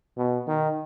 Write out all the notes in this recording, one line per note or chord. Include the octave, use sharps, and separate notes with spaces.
B2
D#3